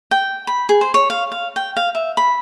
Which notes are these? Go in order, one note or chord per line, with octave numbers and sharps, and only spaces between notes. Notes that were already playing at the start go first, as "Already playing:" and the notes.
G5
B5
G#4
C5
C#5
F5
F5
G5
F5
E5
B5